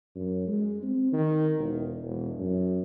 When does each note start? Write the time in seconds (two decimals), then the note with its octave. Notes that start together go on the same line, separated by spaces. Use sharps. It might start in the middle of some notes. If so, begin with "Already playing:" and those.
0.15 F#2
0.48 G#3
0.83 C4
1.12 D#3
1.58 E1
2.03 E1
2.38 F#2